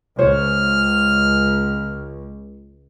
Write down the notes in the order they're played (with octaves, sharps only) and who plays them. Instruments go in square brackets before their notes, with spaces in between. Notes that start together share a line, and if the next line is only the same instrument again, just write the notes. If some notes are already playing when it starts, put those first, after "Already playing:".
[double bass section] C#2 [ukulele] C5 C#5 [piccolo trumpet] F6